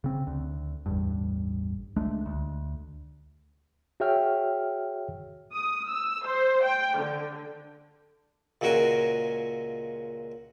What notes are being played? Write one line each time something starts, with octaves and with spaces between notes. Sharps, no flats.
C#3 C4
D2
A1 E2 G2
C#2 G#3 A3 D4
D2
F#4 G#4 C#5 E5 G5 F6
D#6
E6
C5
G5
D3
C#2 A#2 G#3 F#4 A#4 G#5